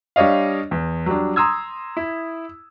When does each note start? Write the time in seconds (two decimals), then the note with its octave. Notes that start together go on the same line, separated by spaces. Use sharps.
0.16 G3 D4 C#5 D#5 F5
0.71 E2
1.06 F#3 G3 D4
1.36 A#5 C6 D#6 E6 G#6
1.97 E4